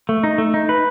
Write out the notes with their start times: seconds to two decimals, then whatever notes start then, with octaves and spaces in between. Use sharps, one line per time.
0.09 A3
0.24 D#4
0.38 A3
0.54 D#4
0.69 B4